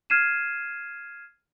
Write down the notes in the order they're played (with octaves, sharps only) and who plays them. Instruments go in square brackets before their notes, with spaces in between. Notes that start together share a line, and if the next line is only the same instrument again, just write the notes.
[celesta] F6 G#6 C7 D#7 E7